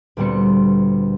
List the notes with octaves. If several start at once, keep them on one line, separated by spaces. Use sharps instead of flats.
D2 A#2 G3 B3 C4 C#7